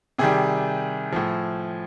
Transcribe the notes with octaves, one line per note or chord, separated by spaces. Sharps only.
C3 D#3 G3 G#4
A2 F3